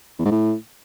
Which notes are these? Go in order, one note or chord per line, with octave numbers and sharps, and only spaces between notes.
E2
G#2
A2